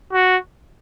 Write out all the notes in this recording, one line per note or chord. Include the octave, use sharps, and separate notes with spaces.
F#4